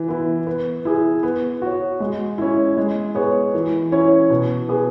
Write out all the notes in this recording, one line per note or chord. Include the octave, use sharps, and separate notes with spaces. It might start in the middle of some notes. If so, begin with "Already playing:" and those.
Already playing: E3
B3 E4
B3
E4 G#4
B3
F#4 C#5
G#3
C#4 E4
G#3
B3 G#4 C#5
E3
C#4 E4 C#5
B2
B3 G#4